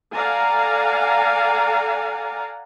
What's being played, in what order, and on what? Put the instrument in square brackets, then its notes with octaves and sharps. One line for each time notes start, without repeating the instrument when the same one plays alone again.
[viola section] A4 D5 F5 F#5 G#5 A#5